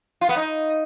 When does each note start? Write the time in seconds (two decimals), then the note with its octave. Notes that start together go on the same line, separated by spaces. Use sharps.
0.21 F4
0.29 B3
0.37 D#4